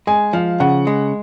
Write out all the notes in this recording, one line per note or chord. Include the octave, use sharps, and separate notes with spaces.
G#3 G#5
F3 F5
C#3 F#5
G#3